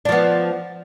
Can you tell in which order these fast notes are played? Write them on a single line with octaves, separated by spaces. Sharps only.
D4 F3 B3